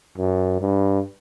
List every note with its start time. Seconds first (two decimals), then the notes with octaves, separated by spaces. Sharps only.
0.18 F#2
0.61 G2